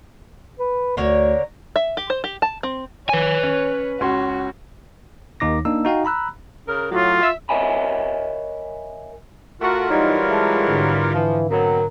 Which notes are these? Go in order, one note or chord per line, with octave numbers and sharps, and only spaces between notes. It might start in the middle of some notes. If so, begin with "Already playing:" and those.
B4
D2 D3 A#4 C#5
E5
G4
C5
G4
A5
C4
B4 C#5 G#5
C#4
C#2 C#4 F#4 C6
D#2 D#3 D#4 D6 A#6
A#3 D4 D#4 E6
D#4 F#4 F5 G5
A#5 B5 E6 F#6
C#3 A#4
A2 F#3 F4
E5
A#4 C#5 D#5 E5 G#5 B5
A3 F4 F#4 A#4
E3 F#3 G3 D#4 F#5 C6
G#3 E5 A5
G#2 D3 D4
E3 F3 F5
B2 F#3 B3 C4 A#4